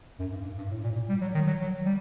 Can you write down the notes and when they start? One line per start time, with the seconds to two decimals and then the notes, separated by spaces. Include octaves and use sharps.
0.20 F#2
0.32 G2
0.45 G2
0.58 G2
0.71 A2
0.84 A#2
0.96 A#2
1.09 G3
1.21 F#3
1.35 D#3
1.47 F#3
1.61 F#3
1.86 G3